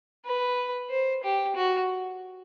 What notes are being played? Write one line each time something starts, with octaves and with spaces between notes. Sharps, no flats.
B4
C5
G4
F#4